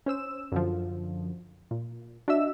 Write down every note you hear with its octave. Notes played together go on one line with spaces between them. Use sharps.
C#4 C5 E6 E7
F#2 D3 F3
A#2
D4 F#4 D#5 E5 E6 E7